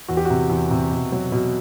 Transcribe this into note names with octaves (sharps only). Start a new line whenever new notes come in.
E2 F#4
G4
C3 F#4
E2
C3
B2
F#3
B2